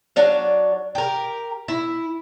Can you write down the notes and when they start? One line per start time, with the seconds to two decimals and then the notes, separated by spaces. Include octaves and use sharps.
0.16 F#3 D4 F5
0.95 G4 A#4
1.68 E4